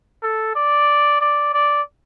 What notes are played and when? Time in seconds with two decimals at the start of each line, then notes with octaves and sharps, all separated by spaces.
0.23 A4
0.55 D5
1.21 D5
1.53 D5